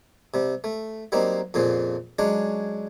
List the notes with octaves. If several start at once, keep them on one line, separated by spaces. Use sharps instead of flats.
C3 G3
A3
F#3 G3 A#3 C4 D#4
F2 A#2 C#3 F3
F#3 G#3 C#4 D4